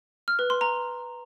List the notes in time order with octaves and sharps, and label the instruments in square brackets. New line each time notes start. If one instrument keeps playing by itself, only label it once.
[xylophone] F6
B4
C6
A#5